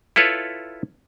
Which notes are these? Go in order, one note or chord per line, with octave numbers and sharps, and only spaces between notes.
E4 F4 A4 B4 C#5